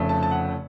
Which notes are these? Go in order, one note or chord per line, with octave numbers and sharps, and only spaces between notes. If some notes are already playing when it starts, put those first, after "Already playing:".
Already playing: F1 F2 C#3 F3 A3
A5
A5
F#5